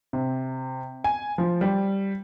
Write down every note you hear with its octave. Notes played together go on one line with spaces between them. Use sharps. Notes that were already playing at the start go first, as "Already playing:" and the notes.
C3
G#5
F3
G3